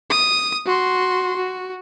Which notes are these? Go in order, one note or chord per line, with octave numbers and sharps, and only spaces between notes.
D#6
F#4 C6
F#4